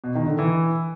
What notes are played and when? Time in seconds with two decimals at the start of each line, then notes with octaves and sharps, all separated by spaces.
0.04 B2
0.15 D#3
0.27 D3
0.39 E3